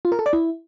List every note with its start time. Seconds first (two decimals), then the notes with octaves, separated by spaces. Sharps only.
0.05 F4
0.12 A#4
0.19 A4
0.26 D5
0.33 E4